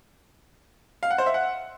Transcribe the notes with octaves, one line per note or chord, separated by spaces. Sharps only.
F5
F#5
C5
E5
F#5